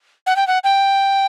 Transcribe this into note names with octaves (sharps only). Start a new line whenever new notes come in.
F#5
G5
F#5
G5